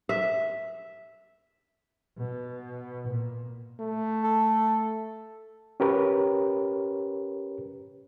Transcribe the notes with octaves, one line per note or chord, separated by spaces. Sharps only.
E5
B2
A#2
A3
A4
C#4 G4 A#4 B4 C#5